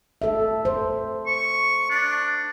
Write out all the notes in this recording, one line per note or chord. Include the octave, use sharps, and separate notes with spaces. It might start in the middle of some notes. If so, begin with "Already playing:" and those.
A4 E5
C5
C#6
D4